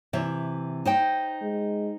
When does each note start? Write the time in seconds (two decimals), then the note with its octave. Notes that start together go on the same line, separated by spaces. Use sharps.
0.13 C3 E3 E5
0.85 D#4 C5 G5
1.43 G#3